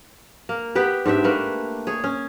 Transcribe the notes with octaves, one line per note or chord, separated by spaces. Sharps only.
A#3
B3 G4 B4
G#2 D4 G4 E5
A3 A#3 B4
G#4 C#5
C#4